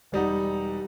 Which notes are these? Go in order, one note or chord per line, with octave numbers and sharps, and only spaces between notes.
E1 G3 D#4 F#5